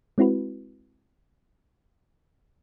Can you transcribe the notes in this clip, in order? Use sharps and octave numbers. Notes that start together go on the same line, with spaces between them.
G#3 C4 E4 F#4 B4